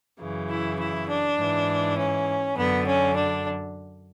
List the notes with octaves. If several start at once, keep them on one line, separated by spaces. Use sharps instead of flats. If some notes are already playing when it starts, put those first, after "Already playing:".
F#2 C#3 E3
E4
E4
D4
G#2 E3
C#4
F#2 D3 B3
C#4
D4